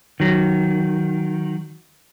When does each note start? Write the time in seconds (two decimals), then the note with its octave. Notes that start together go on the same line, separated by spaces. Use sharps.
0.20 D#3 F#3